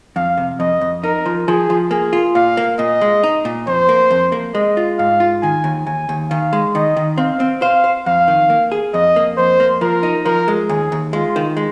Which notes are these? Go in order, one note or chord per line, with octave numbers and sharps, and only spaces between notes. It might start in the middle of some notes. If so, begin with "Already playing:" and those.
F2 F5
C3
F2 D#5
F2
D#4 A#4
F3
F3 G#4
F3
A#3 G#4
F4
A#2 F5
A#3
A#2 D#5
G#3
D#4
A#2
F2 C5
A#3
F2
A#3
G#3 D#5
F4
G#2 F5
F4
D#3 G#5
D#2
D#2 G#5
D#2
D#3 F5
G#3
D#3 D#5
D#3
C4 F5
C4
C5 F5
C5
F2 F5
D#3
A#3
G#4
F2 D#5
A#3
F2 C5
A#3
F3 A#4
D#4
F3 A#4
G#3
D#2 G#4
D#2
G#3 F4
D#3
G#3